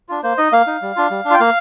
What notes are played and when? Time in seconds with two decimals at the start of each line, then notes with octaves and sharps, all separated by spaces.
0.09 D4 F4
0.23 A#3 C5
0.38 D#4 D#5
0.52 A#3 F5
0.67 D#4
0.82 G3
0.96 D4 F4
1.10 G3
1.25 D4
1.30 F4 G5
1.40 A#3 F5